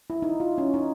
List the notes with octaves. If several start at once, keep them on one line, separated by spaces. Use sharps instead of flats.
E4
D#4
F4
C#4
D#4